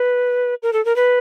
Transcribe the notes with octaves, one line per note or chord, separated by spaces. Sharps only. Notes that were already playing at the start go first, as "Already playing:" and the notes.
Already playing: B4
A#4
A4
A#4
B4